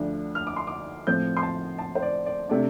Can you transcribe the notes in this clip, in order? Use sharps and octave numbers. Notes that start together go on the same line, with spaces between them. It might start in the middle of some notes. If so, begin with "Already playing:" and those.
Already playing: D2 D3 F3 D4
F6
D6
C6
D6
A2 F3 C4 G6
C6
A5
A5
C5
D5
D5
C3 A3 D4 D5